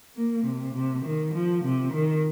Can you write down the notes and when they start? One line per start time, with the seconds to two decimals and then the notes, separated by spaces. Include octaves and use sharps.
0.16 A#3
0.45 C3
0.74 C3
1.05 D#3
1.34 F3
1.64 C3
1.93 D#3